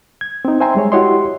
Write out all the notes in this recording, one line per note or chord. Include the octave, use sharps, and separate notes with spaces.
G#6
C4 D#4
C5 E5 G5 G#5 A#5 C6
G3 G#3 C#5
E4 F#4 G4 C#5 D#5 C6